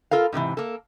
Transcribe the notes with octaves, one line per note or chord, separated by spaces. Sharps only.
F4 A4 A#4 F5
G#2 C3 D#3 E3
A#3 A4